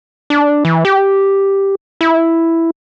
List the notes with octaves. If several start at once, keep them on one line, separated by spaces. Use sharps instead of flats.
D4
E3
G4
E4